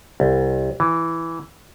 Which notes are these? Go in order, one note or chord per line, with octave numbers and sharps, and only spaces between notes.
C2
E3